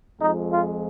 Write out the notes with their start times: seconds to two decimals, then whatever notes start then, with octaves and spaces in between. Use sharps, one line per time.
0.20 F2 F3 G#3 D#4
0.50 F4